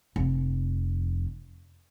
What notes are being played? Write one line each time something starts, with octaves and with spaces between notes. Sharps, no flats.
F1 F2